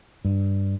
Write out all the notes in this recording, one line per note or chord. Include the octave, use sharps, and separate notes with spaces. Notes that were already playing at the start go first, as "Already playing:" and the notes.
G2